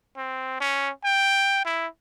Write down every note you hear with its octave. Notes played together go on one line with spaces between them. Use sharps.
C4
C#4
G5
E4